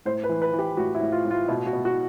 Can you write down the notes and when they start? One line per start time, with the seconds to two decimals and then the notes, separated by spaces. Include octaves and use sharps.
0.05 A2 C5
0.24 B4
0.29 E3
0.42 B4
0.53 E3
0.59 G4
0.77 A2 F#4
0.95 E4
1.01 A2
1.12 F4
1.25 A2
1.31 F4
1.48 B2 E4
1.67 F#4
1.73 B2
1.85 F#4